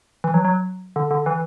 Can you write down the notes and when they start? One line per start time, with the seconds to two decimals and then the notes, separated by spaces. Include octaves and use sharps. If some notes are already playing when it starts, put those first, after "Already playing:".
0.24 E3
0.34 F#3
0.45 F#3
0.96 D3
1.11 D3
1.26 E3